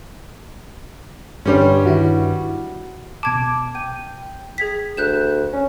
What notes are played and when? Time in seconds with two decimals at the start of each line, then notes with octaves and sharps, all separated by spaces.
1.46 G2 D3 G3 C#4 C#5
1.85 D#3 E4 F#4
3.23 B2 A5 D6 G#6
3.75 G5 D#7
4.58 G#4 G#6 B6
4.97 D2 F#6 G6 E7
5.53 C#4